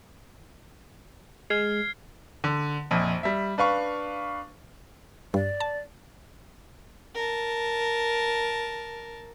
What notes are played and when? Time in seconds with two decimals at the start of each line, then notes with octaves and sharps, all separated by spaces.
1.50 G#3 F6 G#6 C7
2.44 D3
2.91 A#1 F2
3.23 G3 E5
3.58 D4 B4 F5 C#6
5.34 G2 D5
5.60 A5
7.15 A#4 A5